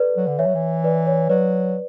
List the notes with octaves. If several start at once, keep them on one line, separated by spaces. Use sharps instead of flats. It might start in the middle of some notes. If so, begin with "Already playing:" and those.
Already playing: A4 B4 D5
F#3
D3
E3 C#5 E5
F#3
E3
B4 D5
C#5
F#3 B4 D5